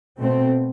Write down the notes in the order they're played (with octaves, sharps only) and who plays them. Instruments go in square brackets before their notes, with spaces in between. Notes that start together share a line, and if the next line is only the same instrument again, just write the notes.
[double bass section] B2 A3 C4